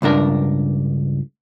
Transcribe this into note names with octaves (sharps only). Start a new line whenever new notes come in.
C#2 G2 D4 A#4